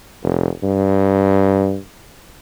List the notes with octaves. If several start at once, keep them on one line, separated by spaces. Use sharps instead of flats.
F1
G2